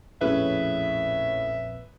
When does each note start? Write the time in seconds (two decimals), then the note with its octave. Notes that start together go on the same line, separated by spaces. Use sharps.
0.21 A#1 F2 A2 A#3 C#4 G#4 B4 E5